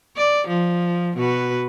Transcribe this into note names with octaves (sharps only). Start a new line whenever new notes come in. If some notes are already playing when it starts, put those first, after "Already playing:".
D5
F3
B2 F#4 B4